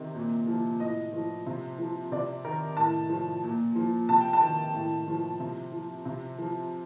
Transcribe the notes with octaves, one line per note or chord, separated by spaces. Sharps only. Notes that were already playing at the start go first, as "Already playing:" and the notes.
Already playing: C3 D#3
A#2
F3
A2 D#5
F3
C3
F3
C3 D5
D#3 A#4
A2 A5
F3
A#2
F3
C3 A5
G5
A5
D#3
A2
F3
C3
F3
C3
F3